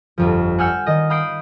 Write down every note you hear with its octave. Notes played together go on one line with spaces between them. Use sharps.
G1 F2 F3
F#5 G#5 E6 F6 G6 C#7
D#3 D#5
F5 B5 D#6 G6 C7 D7